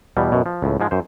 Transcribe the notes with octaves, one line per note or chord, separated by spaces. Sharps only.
E2 B2 G3
F#2 B2
F3
C#2 A2
G#2 F3 G#3
F#2 C5